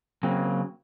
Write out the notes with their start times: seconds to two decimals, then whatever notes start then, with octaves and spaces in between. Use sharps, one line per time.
0.23 C#3 F#3 A#3 C4